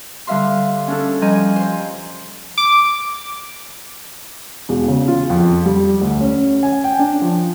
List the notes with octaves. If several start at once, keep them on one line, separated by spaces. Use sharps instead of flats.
D3 G3 E5 F5 C6
C#4 D4 A4
F3 G3 D#5 G#5 A#5 G6
C5
D6
E1
C#3
F4
F2
G3
D2
C#4
G#5
G5
D4
F3